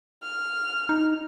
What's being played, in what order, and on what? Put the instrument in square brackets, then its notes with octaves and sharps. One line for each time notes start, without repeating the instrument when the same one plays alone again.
[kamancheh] F6
[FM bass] D#4